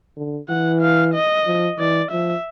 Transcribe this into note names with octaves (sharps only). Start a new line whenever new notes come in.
D3
E3 F#5
F5
D#5
F3
E3 D5
F3 E5